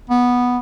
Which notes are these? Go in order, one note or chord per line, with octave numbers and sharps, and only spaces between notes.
B3